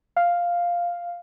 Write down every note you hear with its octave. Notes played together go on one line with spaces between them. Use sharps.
F5